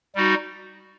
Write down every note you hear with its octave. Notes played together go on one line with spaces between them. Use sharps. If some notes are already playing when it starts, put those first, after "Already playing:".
G3 D#4 F#4